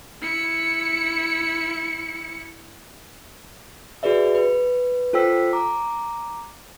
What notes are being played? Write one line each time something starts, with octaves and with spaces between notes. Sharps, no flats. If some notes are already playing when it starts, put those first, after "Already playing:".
E4 C#7
F#4 G#4 B4 D5 E5
B4
F4 A4 C5 G5 E6 B6
A#5 D6